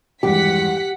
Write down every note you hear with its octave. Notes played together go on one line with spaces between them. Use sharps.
G#1 E2 G2 G4 F#5 B6